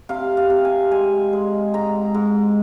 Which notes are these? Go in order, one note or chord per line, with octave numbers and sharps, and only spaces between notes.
C3 F5
F5
C3
G#5
G#3 G#5
G#3
G#2 A#5
G#2